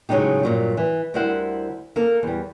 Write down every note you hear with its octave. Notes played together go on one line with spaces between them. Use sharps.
A2 C#3 F#3 G#3 D#4 G4
G2 A#2 F#3
E3
D2 G3 E4 A#4 C5 F#5
A#3 A4 A#4
E2 G3